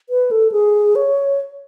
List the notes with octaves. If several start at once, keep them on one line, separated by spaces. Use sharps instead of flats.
B4
A4
G#4
C#5